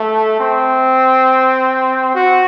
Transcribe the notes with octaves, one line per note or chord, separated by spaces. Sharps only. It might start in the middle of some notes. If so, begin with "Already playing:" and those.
Already playing: A3
C4
F#4